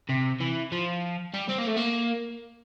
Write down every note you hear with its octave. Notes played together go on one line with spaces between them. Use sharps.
C3
E3
F3
G3
C4
A#3
A3
A#3